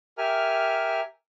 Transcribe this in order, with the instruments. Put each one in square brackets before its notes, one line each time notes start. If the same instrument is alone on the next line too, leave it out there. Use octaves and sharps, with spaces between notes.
[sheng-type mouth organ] G4 A#4 E5 G#5 F6